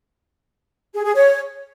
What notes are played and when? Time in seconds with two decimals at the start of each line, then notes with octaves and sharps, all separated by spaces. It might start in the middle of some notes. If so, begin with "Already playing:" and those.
0.93 G#4
1.04 G#4
1.15 C#5